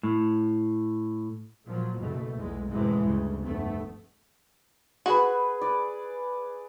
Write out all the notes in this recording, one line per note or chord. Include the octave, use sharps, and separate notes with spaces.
A2
A#2 F3 F#3
F#1 B2 A3
B1 E2 G#3
F#2 A2 C3 E3 G#3
D2 G2 C#3
F1 G2 A3 B3
F#4 G#4 B4
D5